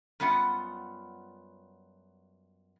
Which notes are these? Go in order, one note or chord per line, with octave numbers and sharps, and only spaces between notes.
F#2 G3 B3 F4 F#5